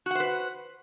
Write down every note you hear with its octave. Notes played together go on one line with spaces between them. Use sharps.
F#4 B4 C5 F#5